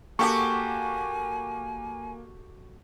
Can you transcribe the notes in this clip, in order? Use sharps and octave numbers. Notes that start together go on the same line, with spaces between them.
A#3 F#4 G4 A4 G#5 C#6